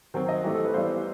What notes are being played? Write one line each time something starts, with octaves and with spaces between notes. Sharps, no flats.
D#3 F#3 C4 C5
D#5
E3 A3 C4 G4
A4
B4
E3 G3 B3 C5